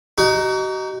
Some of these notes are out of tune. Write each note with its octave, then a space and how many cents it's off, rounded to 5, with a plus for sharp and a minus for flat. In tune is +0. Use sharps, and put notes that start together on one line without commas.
D#4 +0 F#4 +40